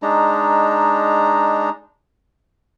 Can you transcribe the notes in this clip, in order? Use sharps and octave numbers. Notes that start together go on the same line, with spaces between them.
G#3 D4 D#4 A#5